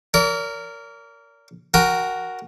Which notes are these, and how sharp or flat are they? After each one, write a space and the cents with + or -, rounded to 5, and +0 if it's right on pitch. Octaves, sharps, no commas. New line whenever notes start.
A#4 -10 D5 -45
F#4 +0 A#4 +0 G5 +40